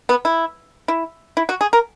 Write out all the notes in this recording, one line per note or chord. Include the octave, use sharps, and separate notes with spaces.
B3
E4
E4
E4
F#4
G#4
A#4